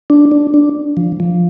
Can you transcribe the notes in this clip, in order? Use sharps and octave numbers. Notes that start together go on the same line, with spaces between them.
D4
D4
D4
F3
F3